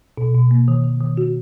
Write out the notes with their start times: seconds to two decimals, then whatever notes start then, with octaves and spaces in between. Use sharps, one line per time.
0.18 B2
0.34 B2
0.51 A#3
0.68 D#3
0.84 D#3
1.01 D#3
1.17 F#4